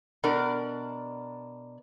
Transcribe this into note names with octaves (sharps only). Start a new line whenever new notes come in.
B2 D4 A#4